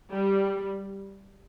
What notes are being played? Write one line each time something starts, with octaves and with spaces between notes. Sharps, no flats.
G3